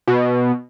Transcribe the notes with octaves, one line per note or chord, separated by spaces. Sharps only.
B2